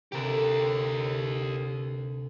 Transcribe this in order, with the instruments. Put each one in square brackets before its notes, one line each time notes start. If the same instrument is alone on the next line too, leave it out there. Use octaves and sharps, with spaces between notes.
[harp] D2 C3 [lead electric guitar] G4 A#4